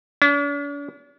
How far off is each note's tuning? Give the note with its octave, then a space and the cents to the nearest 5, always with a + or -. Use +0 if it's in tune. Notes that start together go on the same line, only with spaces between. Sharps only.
D4 -45